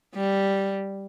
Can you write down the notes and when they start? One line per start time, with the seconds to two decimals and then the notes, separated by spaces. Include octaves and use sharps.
0.15 G3